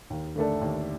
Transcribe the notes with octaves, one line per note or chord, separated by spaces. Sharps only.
D#2
D3 A3 D4 A4
D#2